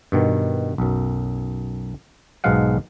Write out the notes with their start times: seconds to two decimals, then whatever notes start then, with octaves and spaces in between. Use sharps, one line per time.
0.12 G2 B2 D#3
0.78 B1 F#2
2.44 B1 G#2 B2 G#3 F5 F#5